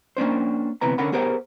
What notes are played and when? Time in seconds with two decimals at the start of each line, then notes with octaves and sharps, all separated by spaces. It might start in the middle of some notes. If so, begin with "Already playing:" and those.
0.17 A#3 C#4 D4 C5
0.81 D2 C3 E3 B3 A#5
0.98 D3 C#4 A#4 F#5 B5
1.12 B3 G4 G#4 A#4 C5 F#5